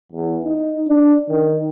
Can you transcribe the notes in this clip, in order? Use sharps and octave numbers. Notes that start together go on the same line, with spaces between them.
E2
D#4
D4
D#3